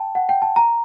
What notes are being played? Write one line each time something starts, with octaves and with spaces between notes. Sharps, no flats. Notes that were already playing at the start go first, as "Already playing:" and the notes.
Already playing: G5 A5
F#5
G5
A5
A#5